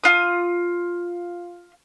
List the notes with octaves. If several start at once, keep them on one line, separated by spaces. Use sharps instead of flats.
F4 D#6